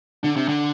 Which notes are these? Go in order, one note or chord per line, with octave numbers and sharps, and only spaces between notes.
D3 D4
C3
D3